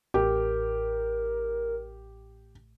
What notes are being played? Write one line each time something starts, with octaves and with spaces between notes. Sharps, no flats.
A1 G4 A#4